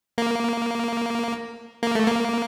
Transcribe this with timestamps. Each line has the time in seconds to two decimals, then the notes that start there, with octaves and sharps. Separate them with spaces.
0.18 A#3
1.83 A#3
1.95 A3
2.07 A#3